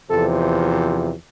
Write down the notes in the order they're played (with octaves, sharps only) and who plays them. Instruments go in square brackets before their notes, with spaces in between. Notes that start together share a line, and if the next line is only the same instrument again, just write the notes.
[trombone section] E2 C3 F3 A4